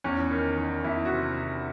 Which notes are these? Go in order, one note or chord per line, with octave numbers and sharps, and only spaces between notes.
E2 C#4
D#3
D#3
E2 E4
F#4
C3